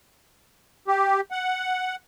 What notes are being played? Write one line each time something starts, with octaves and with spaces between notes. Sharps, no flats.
G4
F#5